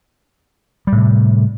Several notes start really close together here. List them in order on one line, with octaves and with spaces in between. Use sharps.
G3 A2 C3